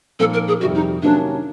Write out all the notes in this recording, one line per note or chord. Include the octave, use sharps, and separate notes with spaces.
A#2 F3 A#3 D#4 A4
A#4
G#4
F2 C3 D#3 G3 F#4
D#4
C3 D#3 F#3 A#3 C#4 D4